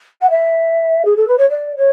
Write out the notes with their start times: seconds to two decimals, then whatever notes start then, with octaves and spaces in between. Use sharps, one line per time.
0.21 F#5
0.30 E5
1.05 G#4
1.16 A4
1.27 B4
1.37 C#5
1.50 D5
1.76 C#5